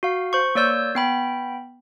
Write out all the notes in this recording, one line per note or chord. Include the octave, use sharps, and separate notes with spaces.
F#4 F5
C5 C#6
A#3 C#5 D5 E6 G6
B3 G5 B5